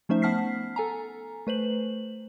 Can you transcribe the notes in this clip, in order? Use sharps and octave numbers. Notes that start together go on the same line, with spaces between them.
F3 A3 C#4 D#4 C5 E5
B3 F#5 A5 F6 B6 C7
A4 G#5 A#5
A3 B4 C5 F#7